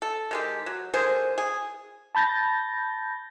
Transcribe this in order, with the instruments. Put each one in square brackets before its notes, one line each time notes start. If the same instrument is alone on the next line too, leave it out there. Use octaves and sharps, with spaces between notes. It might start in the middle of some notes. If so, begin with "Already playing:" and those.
[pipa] A4
D#3 G#3 G4
F#3
D3 D#3 G#4 C5
G#4
[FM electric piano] A5 B5 G6 A6 A#6